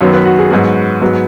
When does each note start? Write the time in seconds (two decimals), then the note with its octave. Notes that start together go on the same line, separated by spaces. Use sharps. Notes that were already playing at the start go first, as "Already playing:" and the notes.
0.01 F#2 D#3 F#3 B3 C#5
0.14 B4
0.25 F#4
0.39 G#4
0.51 G#2 F#3 B3 F#4
1.02 G#2 F#3 B3